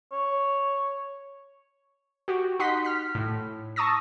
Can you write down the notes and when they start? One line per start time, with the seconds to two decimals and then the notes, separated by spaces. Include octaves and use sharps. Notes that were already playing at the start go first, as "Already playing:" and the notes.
0.13 C#5
2.28 F#4 G4
2.59 D#4 F#5 C6 B6
2.85 F6 B6
3.15 A2
3.76 A5 C#6 D#6 E6 A#6